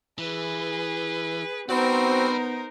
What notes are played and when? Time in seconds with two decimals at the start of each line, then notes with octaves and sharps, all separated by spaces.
0.18 E3 G#4 B4
1.69 B3 C4 D#4 F#4 A#4 C5 D5 B5